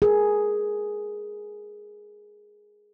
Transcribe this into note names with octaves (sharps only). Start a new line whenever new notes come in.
G#4 A#4